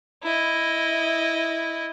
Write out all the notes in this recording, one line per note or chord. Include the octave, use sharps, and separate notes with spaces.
E4 D#5